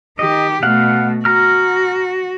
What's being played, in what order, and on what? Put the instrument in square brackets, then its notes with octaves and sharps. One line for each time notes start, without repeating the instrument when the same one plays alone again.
[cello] D#3 G4 [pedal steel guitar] D#5
[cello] B2 A3 [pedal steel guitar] F5 F#5
[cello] F#4 [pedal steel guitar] A#5 F6